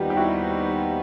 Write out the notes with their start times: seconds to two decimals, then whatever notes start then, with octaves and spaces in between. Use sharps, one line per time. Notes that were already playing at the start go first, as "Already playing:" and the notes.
Already playing: D#2 D#3 G3 B3 D#4 F4 G4 C5
0.10 G4
0.16 E4 F#4